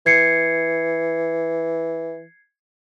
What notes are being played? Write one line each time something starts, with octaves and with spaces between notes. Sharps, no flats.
E3 G#6 C7 C#7